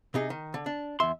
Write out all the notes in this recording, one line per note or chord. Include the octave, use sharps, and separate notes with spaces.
C3 D#4 G#4
D#3
D3
D4
E2 E5 C6